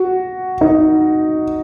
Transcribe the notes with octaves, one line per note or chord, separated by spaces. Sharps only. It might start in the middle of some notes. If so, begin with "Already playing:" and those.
Already playing: F#4
D#4